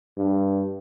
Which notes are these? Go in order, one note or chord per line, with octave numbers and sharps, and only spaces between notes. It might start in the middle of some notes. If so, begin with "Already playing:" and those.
G2